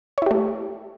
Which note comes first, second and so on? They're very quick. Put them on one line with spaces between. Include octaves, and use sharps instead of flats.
C#5 E4 G4 A3